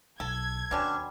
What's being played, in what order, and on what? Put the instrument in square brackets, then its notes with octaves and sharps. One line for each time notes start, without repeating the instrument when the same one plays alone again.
[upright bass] B1 [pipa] A4 [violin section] G#6
[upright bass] D#2 [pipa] B2 D3 G3 [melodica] C#4 D4